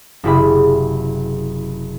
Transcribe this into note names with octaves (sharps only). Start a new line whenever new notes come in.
F#1 C3 E4 G4 G#4 B5